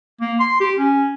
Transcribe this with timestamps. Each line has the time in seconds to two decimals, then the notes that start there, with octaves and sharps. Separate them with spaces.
0.21 A#3
0.40 C6
0.60 G4
0.78 C#4